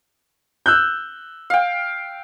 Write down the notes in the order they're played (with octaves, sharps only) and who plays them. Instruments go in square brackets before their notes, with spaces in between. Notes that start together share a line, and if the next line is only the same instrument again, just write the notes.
[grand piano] E6 F#6 G6
[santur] F5 G5